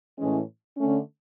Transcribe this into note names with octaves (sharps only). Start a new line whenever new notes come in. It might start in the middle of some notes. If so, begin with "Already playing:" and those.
A2 E3 G#3 C#4
D3 A3 C#4